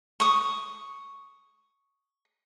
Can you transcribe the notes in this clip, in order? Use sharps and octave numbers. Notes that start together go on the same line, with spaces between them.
C#6 D#6